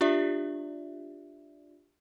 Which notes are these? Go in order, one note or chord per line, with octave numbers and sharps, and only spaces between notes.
D4 F4 G4 D5 E5